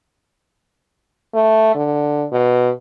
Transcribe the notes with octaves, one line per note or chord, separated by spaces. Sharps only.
A3
D3
B2